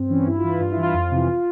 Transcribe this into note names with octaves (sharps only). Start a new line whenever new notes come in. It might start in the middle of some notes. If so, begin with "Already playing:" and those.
Already playing: G2 C4
E3 C#4
G2 E4
F4
E3
E4
G2 F4
E4
E3
F4
F2
C3 E3